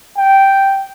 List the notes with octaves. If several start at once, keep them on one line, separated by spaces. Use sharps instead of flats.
G5